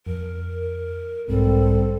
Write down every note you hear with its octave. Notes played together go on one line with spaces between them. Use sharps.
F2 A#4
B1 G#2 G3 C4 A4